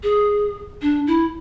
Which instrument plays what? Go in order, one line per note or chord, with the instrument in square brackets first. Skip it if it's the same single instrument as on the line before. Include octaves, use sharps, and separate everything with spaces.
[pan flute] G#4
D4
E4